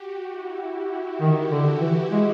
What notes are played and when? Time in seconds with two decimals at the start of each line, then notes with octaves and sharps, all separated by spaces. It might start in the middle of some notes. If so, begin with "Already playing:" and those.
Already playing: F#4 G4
0.31 E4
1.21 D#3
1.51 D3
1.81 E3
2.11 G#3